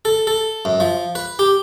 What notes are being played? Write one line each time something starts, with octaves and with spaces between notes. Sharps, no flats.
A4
A4
F#2
F3
B4
G4